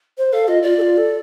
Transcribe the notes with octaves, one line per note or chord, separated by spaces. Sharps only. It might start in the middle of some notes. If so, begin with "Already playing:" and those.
C5
A4 F5
F4 D#5
F4 D5
A4
F4
A4